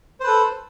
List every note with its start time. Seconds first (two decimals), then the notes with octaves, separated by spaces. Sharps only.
0.20 C5
0.24 B4
0.27 A4